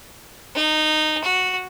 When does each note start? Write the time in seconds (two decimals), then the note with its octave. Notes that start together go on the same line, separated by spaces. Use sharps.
0.55 D#4
1.24 F#4